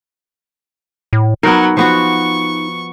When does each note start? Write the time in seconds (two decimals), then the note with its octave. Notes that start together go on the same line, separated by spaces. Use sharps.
1.13 A2
1.43 F#3 B3 D#4 A#4
1.77 F3 B3 F#4 C#6